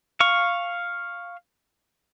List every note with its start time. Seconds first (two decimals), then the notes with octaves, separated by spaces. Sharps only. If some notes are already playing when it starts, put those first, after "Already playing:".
0.20 F5 C#6